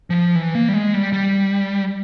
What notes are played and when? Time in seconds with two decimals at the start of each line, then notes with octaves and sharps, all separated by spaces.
0.10 F3
0.35 E3
0.55 A#3
0.69 G3
0.74 G#3
0.94 G3
1.13 G3